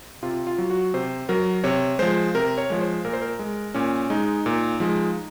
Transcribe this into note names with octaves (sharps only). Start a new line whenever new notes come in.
C3 F4
F4
F#3
F#4
C3 C5
F#3 A#4
C3 C#5
F3 G#3 C5
C3 A#4
C#5
F3 G#3
C5
A#2 A#4
C5
A#4
G#3
A#2 C#4
G#3 D#4
A#2
F3 G#3